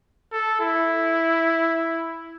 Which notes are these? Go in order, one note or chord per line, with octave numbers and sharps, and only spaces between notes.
A4
E4